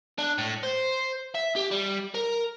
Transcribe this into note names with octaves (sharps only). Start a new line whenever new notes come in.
D4
A2
C5
E5
G4
G3
A#4